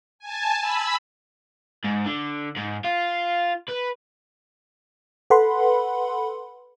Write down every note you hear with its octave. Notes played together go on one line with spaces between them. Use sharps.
G#5 A5
B5 E6
G#2
D3
G#2
F4
B4
A4 B4 F#5 B5 C6